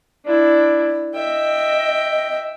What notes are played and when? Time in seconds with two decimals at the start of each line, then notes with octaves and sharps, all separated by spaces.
0.25 D4 E4
1.14 D#5 E5 G5